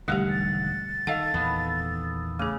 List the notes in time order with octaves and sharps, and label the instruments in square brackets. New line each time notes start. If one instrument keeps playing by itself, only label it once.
[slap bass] E1 D3 D#3 [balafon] G3 A3 G4 [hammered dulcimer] F#5
[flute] A6
[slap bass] D#3 [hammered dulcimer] A4 F5 [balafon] D#5 F#5
[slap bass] E2 A#2 D#3 [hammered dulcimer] B3
[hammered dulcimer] C#3 [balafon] A3 G#4 [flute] D6